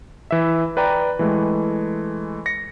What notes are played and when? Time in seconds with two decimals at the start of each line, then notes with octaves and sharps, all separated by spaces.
0.31 E3 E5
0.77 B4 D5 G5 A#5
1.19 E3 G#3 A3
2.46 A#6 C#7